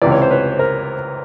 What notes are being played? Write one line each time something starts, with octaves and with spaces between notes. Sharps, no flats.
C#2 C3 E3 D5
C#5
C5
B4 C#5
A#4 C5